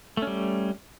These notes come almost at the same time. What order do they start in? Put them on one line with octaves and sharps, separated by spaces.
A3 C#4 G3